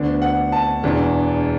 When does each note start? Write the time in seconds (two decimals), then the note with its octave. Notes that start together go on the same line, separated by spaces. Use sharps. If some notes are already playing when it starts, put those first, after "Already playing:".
Already playing: D2 D3 B3 D4
0.22 F#5
0.52 A5
0.83 E1 E2 E3 D4